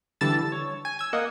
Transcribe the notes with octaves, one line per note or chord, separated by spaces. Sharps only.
D3 E3 G3 A5 E6 A6
C#5
G#5
E6 G#6
A#3 D#5 F#5